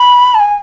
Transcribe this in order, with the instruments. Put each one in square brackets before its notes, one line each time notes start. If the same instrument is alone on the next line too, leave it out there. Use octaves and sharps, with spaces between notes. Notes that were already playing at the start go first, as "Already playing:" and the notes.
Already playing: [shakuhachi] B5
A5
G#5